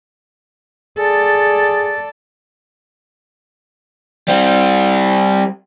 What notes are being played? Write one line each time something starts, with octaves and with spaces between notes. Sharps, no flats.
G#4 A4 D5
G3 C4